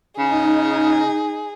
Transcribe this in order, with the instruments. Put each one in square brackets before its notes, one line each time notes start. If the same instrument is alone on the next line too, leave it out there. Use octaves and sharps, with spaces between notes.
[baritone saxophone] C#3 [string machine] D#4 [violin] G#4